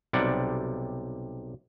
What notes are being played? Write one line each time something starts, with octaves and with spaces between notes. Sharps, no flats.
B1 C3 G3 D5 F#5